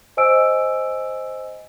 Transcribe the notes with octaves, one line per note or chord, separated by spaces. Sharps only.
C5 D#5 G#5 E6 D7